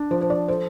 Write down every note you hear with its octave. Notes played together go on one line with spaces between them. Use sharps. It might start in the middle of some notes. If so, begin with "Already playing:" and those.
Already playing: D4
F3 C5
C5
D5
A4 C5